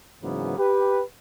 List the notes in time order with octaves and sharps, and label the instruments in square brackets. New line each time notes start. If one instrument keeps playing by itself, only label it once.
[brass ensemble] G#2 C#3 E3 F#3 A#3 B3
G4 B4